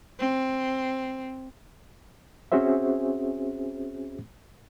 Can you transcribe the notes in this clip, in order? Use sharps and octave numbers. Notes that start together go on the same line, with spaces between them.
C4
C4 C#4 F#4 G#4 C5 E5